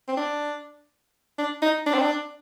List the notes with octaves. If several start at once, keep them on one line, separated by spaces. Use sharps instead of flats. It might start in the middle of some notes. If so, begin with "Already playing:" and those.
C4
D4
D4
D#4
D4
C4
D4